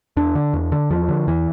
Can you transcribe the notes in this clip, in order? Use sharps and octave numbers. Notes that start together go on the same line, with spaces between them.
E2 D4
D3
E2
D3
E2 F3
D3
E2 E3